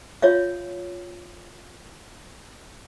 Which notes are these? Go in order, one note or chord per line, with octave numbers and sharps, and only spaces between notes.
F4 C#5 E5 F5